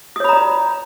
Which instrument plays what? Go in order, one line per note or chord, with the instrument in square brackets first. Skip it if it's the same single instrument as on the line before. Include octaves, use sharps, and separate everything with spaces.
[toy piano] D#6
C#5
B5
A#5
D5